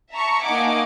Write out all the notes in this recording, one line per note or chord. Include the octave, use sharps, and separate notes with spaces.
E5 A5 A#5 C#6
A#3 D#4 D#5 F#5 G#5 D6